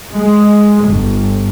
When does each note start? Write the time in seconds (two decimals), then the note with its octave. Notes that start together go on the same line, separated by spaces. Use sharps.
0.15 G#3
0.87 G1